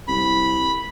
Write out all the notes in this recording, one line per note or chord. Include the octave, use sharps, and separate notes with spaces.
C2 B5